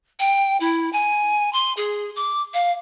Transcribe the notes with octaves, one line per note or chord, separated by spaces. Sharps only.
G5
E4
G#5
C6
G#4
D6
F5